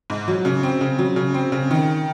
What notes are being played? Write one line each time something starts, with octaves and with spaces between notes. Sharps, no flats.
G#2
F#3
C#3
C4
C#3
F#3
C#3
C4
C#3
D#3